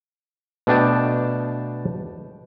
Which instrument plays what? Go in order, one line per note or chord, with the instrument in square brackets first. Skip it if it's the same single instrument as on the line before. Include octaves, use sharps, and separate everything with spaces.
[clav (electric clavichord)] B2 A3 D4 G5 A5